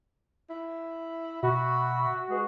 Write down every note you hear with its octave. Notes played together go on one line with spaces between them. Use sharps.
E4
B2 F#4 E5 B5
G#3 B4